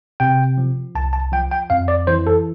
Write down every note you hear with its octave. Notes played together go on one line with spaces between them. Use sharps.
C3 G5
F3
C2 A5
A5
F3 G5
G5
F2 F5
D5
E3 C5
A4